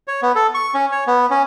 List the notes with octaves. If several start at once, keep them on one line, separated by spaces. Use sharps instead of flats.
C#5
B3
A4
C#6
C#4
C#5
B3
C#4